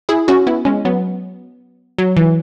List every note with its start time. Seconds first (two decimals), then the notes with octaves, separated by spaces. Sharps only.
0.09 E4 G#4
0.28 C#4 F#4
0.47 B3 E4
0.65 G#3 C#4
0.85 F#3 B3
1.98 F#3
2.17 E3